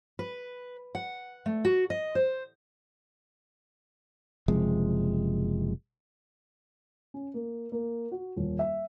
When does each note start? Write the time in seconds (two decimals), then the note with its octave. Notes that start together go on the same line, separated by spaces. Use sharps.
0.19 B4
0.95 F#5
1.46 A3
1.65 F#4
1.90 D#5
2.15 C5
4.48 F#1 C3 F3 G#3
7.14 C#4
7.34 A#3
7.72 A#3
8.12 F#4
8.36 D#1
8.59 E5